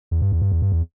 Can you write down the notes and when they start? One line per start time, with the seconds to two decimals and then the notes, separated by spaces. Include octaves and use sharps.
0.11 E2
0.22 G2
0.32 E2
0.42 G2
0.52 E2
0.62 G2
0.72 E2